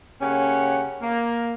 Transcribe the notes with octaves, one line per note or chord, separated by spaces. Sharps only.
C#3 A#3 C#4 G4 C#5 F#5
A#3